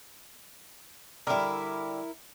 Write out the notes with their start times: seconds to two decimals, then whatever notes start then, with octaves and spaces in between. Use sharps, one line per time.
1.27 D3 G3 E4 A#4